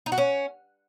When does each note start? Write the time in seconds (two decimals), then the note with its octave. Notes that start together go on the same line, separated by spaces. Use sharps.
0.06 D#4
0.12 F#4
0.18 C#4